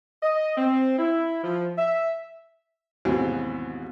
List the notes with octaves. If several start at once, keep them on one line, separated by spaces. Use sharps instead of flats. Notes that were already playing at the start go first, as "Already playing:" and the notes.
D#5
C4
E4
F3
E5
D#2 G#2 B2 E3 F#3 C4